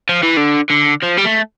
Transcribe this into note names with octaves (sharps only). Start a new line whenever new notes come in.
F3
E3
D3
D3
F3
G3
A3